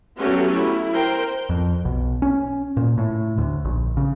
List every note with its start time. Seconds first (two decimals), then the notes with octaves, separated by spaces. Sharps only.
0.18 F#3 A3 B3 C#4 F#4 G4
0.55 E4
0.93 A#4 C5 G5
1.49 F2
1.85 B1
2.22 C#4
2.77 A#2
2.98 A2
3.38 D2
3.65 A#1
3.97 C#3